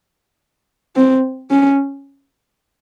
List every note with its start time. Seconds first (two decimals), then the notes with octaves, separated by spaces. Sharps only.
0.96 C4
1.51 C#4